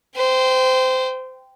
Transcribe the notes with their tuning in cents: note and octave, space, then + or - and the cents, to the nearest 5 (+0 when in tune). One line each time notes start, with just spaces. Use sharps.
C5 -20 G5 +0